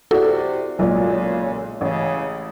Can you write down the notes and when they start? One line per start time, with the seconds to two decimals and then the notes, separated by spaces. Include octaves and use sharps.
0.11 C3 E4 F#4 G#4 A4 D5
0.79 B1 A#2 C#3 F#3 G#3 D5
1.81 A1 C#3